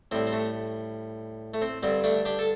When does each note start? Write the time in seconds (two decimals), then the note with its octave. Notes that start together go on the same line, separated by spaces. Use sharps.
0.11 A2 G3 C4
0.27 C4
0.32 A3
1.54 A3
1.62 C4
1.83 G2 D3 G3 C4
2.04 A3 D4
2.25 D4 G4
2.39 A4